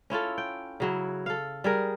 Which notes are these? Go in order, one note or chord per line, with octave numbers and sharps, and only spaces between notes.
C#4 E4 F4 A4
G5
C#3 F#3 E4
A4 F5
G3 G#4 A#4